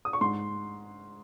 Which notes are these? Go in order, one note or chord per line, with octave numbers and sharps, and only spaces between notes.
D#6
C#6
G#2 C6